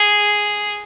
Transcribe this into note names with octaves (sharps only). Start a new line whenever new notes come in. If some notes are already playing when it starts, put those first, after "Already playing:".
Already playing: G#4